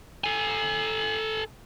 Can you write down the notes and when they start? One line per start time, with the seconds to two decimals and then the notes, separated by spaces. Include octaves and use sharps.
0.24 A4 G#5